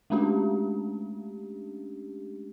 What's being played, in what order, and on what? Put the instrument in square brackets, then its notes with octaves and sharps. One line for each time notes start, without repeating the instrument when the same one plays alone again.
[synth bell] G#3 A3 C#4 D4 G4